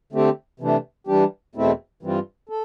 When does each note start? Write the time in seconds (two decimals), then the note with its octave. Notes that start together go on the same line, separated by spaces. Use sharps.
0.13 D3 A3 C4 G4
0.60 C3 E3 A3 D4
1.07 E3 G3 D4 G4
1.55 E2 B2 A3 C4 E4
2.03 G2 E3 G3 C4 F4
2.49 A4